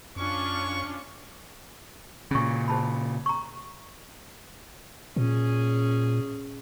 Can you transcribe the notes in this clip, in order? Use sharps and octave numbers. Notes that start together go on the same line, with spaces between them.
F#2 C#4 D4 F4 C#6
A#2 C#3 C#4 C#6
C5 A5 B5
A#5 C#6
A#2 C#4 G#4